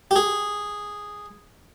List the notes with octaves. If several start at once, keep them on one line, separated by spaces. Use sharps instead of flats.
G4
G#4